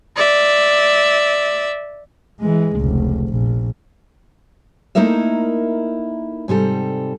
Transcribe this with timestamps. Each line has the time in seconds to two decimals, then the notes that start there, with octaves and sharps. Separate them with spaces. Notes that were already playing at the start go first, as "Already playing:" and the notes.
0.16 D5 E5
2.40 E3 G#3
2.77 F1 C#2
3.28 A#1
4.95 A3 A#3 D#4 E4 A#4 E5
6.48 G#2 C3 G3 A4